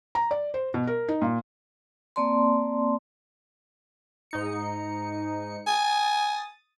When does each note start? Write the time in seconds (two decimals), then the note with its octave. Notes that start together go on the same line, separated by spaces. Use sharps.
0.15 A#5
0.31 D5
0.54 C5
0.74 B2
0.87 A#4
1.08 D#4
1.22 A#2
2.16 A#3 C4 D5 A5 C6
4.31 G#2 D#4 C#7
5.67 G#5 D#6 A6